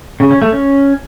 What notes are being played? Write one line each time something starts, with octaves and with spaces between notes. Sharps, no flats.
C#3
C#4
A3
C#4